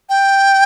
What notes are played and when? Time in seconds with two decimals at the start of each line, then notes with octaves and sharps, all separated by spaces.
0.09 G5